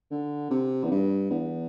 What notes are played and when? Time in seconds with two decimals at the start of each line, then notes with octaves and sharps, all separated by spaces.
0.11 D3
0.51 C3
0.84 E2
0.91 G2
1.30 E2